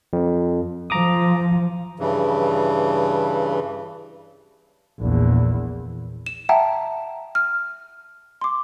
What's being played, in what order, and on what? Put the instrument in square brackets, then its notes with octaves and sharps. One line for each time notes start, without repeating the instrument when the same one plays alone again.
[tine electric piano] F2
[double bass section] F3 [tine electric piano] A#5 D6 D#6
[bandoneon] G2 C#3 E3
[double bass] A#1 E2
[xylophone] E7
E5 F#5 G5 A5 A#5
F6
C6 D6